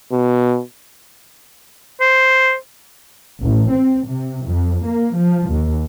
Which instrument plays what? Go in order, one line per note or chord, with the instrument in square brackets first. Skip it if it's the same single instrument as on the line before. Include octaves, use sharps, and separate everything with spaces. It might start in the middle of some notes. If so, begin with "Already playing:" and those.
[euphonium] B2
[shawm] C5
[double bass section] A1
C4
C3
F2
A#3
F3
D#2